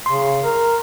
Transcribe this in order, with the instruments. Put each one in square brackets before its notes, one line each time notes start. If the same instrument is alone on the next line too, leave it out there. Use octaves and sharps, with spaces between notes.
[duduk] C#3 [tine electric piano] C6
[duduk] A#4